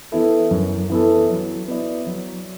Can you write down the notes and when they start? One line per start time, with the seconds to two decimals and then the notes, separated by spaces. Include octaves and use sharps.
0.12 E3 B3 E4 A4
0.51 F#2
0.90 E3 B3 E4 A4
1.29 F#3
1.68 B3 E4 D5
2.07 F#3